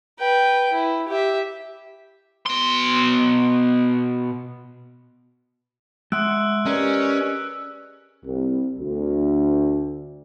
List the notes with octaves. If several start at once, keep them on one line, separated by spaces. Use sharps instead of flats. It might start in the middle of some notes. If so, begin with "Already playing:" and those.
B4 G5
E4
G4 E5
B2 C6
G#3 E5 F#5 C6 D#6 E6 F#6 D7
C#4 G4 G#4 A#4 B4 D5 D#5
C2
D2